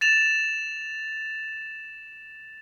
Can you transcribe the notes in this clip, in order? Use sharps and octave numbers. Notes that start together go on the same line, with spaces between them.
A6 E7 F7